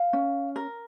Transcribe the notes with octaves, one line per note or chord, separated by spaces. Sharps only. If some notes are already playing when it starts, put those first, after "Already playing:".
Already playing: F5
C#4
A#4